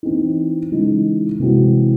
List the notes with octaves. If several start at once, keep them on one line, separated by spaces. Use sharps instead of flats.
E3 C4 D#4
C#3 E3 G#3 D#4
C3 E3 G#3 C4 F#4